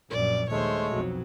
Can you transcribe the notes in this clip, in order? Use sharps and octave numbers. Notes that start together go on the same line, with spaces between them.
A#1 F#2 D5
D#2 G#3 A3 C5 C#5
B1 F2 F#3